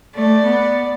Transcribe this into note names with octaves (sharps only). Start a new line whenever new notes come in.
A3 D5
B3